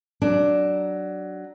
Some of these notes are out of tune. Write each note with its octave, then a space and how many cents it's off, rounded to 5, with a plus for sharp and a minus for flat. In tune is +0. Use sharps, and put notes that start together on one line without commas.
F#3 +15 D4 +0